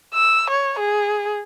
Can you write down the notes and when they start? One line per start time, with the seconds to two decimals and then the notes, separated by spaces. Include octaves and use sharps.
0.14 E6
0.51 C#5
0.79 G#4